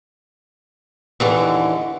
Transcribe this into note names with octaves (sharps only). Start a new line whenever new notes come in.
D#2 D3 E3